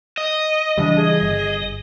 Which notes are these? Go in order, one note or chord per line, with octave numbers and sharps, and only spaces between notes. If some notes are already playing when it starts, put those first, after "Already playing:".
D#5
C#3 E3 G3 D4
G#4
G1